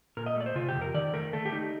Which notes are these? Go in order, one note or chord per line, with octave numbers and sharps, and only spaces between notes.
A#2 A#4
D#5
A3 D5
C5
C3 F4
G4
F2
A#4
D#3 D5
A3 A#4
A3 A4
G4
D#4